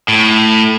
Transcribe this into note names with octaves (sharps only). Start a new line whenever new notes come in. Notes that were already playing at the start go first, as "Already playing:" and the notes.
A2